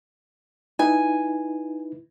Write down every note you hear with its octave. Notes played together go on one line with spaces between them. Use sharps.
D#4 E4 B4 G#5